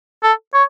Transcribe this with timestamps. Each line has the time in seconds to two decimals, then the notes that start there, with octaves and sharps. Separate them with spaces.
0.23 A4
0.54 C#5